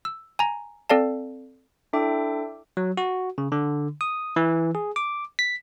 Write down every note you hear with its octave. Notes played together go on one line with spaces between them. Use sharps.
E6
G#5 A#5
C4 A4 D5 F5 A5
D4 E4 A4 E5 G5 D6
F#3
F#4
C#3
D3
D#6
E3
G#4
D6
B6